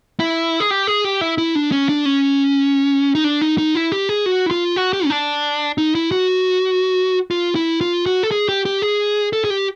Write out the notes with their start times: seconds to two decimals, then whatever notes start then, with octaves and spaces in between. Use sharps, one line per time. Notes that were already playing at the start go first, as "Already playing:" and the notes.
0.20 E4
0.60 G#4
0.71 G4
0.87 G#4
1.04 G4
1.21 E4
1.38 E4
1.55 D4
1.72 C#4
1.89 D4
2.06 C#4
3.15 D#4
3.24 D4
3.41 D#4
3.58 D#4
3.75 E4
3.92 G4
4.09 G#4
4.26 F#4
4.46 E4
4.51 F4
4.76 F#4
4.93 G4
5.05 C#4
5.10 D4
5.78 D#4
5.95 E4
6.11 F#4
7.31 F4
7.55 E4
7.81 F4
8.06 F#4
8.23 A4
8.31 G#4
8.49 G4
8.65 G4
8.82 G#4
9.33 A4
9.44 G#4
9.50 G4